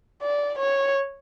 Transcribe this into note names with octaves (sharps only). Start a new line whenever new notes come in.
D5
C#5